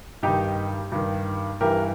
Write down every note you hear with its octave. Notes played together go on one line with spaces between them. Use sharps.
G2 D#3 D#4 G4
G2 D#3
G2 E3 G4 A#4